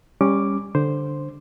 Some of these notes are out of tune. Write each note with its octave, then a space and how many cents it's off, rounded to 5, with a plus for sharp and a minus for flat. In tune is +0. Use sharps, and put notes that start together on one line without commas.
G3 +20 C#4 -5 D6 +0
D3 +0 C5 +0